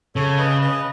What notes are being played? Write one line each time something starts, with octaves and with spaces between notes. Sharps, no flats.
C#3 A4 C#5
B4 D#5
B4 D#5